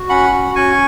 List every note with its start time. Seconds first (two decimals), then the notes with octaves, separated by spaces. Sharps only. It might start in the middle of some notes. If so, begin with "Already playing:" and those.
Already playing: F#4
0.09 C#4 F#5 B5
0.33 F#4
0.56 C#4 G#5 C#6